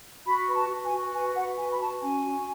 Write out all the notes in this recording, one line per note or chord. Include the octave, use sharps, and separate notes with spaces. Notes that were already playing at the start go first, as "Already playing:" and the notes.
F#4 B5
B4 B5
A5
F#4
G#5
F#4
B4 G#5
B4 F#5
F#4 G#5
B5
F#4 A5
C#4 G#5
F#4